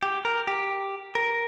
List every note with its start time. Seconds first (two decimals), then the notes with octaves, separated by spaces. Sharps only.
0.03 G4
0.25 A#4
0.47 G4
1.15 A#4